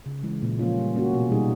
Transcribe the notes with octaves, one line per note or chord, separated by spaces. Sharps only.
C#3
E3 G#3
A#2
F3 A#3 C#4 F4
G3
A#3 C#4 F#4
B2
G3 B3 D#4 G#4